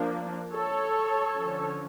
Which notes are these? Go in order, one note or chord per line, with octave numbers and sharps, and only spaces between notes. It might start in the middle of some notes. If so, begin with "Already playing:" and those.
Already playing: F3 A#3 D4
A4 C#5
D3 F3 C#4